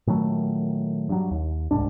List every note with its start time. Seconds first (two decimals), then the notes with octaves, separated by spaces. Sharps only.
0.07 A#2 D#3 F#3 A3
1.09 G2 F#3
1.31 D#2
1.71 D1 C2 G#2 D4